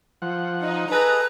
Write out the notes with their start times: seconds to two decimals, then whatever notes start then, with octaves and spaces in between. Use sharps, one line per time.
0.22 F3 F#5
0.62 D#4
0.92 G#4 A4 B4 D#5 A#5 F#6